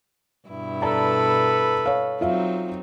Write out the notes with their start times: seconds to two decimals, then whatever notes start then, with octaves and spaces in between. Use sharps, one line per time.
0.48 G2 B2 E4
0.82 A4 B4 D5 A5 A#5
1.86 C#5 F5
2.21 F#3 C4 D#4 F4 E5 F5